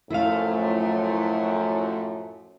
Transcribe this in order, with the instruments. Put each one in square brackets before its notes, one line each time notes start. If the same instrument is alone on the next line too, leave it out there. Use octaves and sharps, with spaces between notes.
[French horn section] F#2 A2 F3 [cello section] A3 [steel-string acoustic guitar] E4 F5